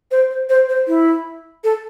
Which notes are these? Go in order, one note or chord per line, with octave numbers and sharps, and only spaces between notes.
C5
C5
C5
C5
E4
A4